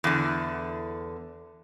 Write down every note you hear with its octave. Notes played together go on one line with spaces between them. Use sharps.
E2 D3